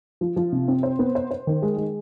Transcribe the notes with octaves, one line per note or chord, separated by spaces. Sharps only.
F3
F3
C3
C4
C5
B3
C5
C5
D#3
G#3
G#3